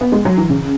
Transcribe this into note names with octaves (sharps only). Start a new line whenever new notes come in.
B3
G#3
F#3
E3
C#3